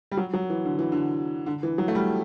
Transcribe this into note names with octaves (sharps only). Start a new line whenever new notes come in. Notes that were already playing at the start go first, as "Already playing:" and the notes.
G3
F#3
F#3
E3
D3
E3
D3
D3
E3
F#3
A3
G3